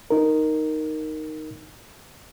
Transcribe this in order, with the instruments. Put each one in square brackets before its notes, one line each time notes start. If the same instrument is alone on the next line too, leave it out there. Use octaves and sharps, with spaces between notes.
[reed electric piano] D#4 A#4